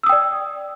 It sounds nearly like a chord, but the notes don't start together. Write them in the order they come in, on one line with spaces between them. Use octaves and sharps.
E6 D#6 G5 D5